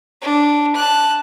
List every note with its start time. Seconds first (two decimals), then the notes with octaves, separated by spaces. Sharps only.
0.22 D4
0.75 A5 F#6